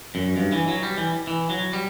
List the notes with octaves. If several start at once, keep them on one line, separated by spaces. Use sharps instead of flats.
F#2
G2
E3
F#3
G3
E3
E3
F#3
G3